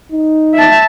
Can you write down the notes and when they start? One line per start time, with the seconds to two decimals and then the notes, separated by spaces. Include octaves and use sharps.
0.12 D#4
0.54 E5 A5